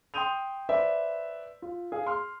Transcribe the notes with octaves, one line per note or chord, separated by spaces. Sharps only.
G5 C6 D#6 G6 D#7 F7
B4 C5 D5 E5
F4
G#4 F5
C6 F6